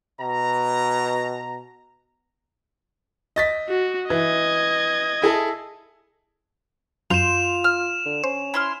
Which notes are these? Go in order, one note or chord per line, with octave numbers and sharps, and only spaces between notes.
B2 A#5
D#5 A6 B6
F#4
E3 D#5 G#6
E4 G#4 A4
F#2 F4 C6 G6 E7 F7
F6
D3
C#4 C5
E4 C6 F6